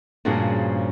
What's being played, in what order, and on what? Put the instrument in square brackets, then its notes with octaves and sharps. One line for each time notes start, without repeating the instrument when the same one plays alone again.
[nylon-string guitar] G2 A#2 C#3 F3 F#4 G#4